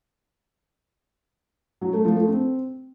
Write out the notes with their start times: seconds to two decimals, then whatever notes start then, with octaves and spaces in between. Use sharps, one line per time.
1.81 F#3
1.93 A3
2.05 F3
2.16 A3
2.28 C4